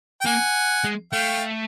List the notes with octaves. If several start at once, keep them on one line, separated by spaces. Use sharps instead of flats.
G5
A#3 F#5 G#5
G#3
A3 F5 G5